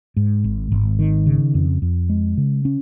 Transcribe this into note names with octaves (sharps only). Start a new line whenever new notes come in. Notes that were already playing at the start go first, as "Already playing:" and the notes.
G#2
G#1
G#1
D#3
C#3
F2
F2
G#3
C#3
C#4